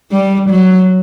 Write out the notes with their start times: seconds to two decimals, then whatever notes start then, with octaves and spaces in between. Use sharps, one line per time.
0.11 G3
0.50 F#3